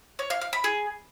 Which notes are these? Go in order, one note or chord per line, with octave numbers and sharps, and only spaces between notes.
C#5
F5
F5
B5
G#4